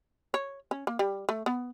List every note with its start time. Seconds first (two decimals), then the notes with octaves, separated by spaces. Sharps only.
0.34 C#5
0.71 C#4
0.87 A#3
0.99 G3
1.29 A3
1.46 B3